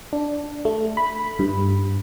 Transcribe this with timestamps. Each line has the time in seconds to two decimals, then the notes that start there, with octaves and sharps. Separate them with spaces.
0.13 D4
0.65 A3
0.97 B5
1.39 G2